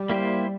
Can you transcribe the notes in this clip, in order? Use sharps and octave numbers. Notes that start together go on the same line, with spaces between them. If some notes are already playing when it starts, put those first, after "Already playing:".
Already playing: G3
A#3 E4 G4 C5